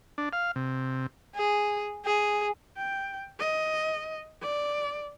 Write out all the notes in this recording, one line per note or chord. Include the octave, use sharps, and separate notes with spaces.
D4
F5
C3
G#4
G#4
G5
D#5
D5